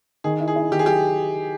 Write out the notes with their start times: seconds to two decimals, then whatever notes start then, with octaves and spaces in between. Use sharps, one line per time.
0.24 D#3 G#4
0.40 E4
0.48 G#4
0.56 E4
0.71 D#3 G4
0.79 G#4
0.86 F#3 G4